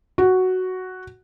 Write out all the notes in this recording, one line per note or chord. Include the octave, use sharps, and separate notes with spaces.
F#4